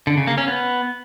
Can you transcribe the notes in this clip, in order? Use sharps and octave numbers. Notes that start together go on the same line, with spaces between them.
D3
C#3
A#3
C#4
B3